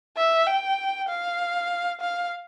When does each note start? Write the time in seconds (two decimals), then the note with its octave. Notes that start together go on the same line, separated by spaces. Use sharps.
0.17 E5
0.46 G5
1.08 F5
2.01 F5